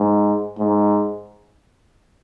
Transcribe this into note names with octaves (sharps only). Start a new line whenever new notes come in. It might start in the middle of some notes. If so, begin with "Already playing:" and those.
Already playing: G#2
G#2